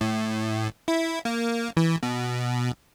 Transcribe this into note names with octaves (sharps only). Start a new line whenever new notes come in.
A2
E4
A#3
E3
B2